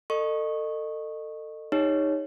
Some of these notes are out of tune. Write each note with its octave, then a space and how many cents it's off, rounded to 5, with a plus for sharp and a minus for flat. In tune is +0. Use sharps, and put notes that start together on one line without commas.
A4 +30 D#5 -25 C#6 -15
D#4 +0 G4 +35 C#5 +0